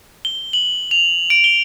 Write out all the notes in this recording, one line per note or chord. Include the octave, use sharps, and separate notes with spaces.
G7
F#7
F7
D7
G7